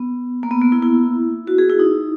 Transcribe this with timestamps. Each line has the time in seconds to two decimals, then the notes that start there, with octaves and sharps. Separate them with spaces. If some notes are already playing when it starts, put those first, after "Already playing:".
Already playing: B3
0.43 A#3
0.51 B3
0.62 A#3
0.72 E4
0.83 E4
1.47 F#4
1.58 G#4
1.70 E4
1.79 D#4